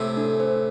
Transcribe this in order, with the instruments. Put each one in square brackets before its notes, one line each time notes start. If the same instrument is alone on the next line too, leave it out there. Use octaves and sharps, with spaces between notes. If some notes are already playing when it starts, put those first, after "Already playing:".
Already playing: [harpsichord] A2 C3 [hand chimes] A4
[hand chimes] D4
C5